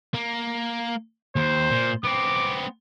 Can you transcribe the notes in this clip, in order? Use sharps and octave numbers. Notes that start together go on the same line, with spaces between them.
A#3
D#2 C5
A#2
B3 C4 D6